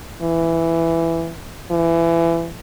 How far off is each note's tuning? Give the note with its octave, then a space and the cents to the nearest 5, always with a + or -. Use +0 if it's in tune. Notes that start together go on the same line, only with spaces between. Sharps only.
E3 +10
E3 +25